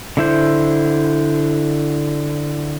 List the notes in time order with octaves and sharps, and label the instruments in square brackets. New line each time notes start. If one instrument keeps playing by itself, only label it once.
[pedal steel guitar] D3 E4 C5